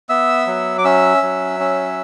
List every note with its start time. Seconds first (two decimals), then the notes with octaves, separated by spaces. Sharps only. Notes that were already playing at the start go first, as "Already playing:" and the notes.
0.09 B3 E5 E6
0.47 F#3
0.78 D6
0.84 C#4 E5 E6
1.22 F#3
1.60 C#4